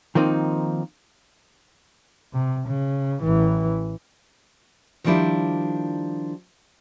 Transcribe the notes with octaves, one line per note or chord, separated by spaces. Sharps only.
D#3 F3 A#3 C4 D#4
C3
C#3
A1 E3
D#3 F3 G3 D4 E4 F4